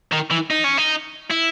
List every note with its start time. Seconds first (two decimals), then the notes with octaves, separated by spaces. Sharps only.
0.12 D#3
0.30 E3
0.50 D#4
0.64 C#4
0.78 D#4
1.30 E4